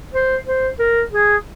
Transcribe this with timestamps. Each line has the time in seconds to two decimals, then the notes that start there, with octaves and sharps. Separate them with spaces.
0.14 C5
0.47 C5
0.79 A#4
1.13 G#4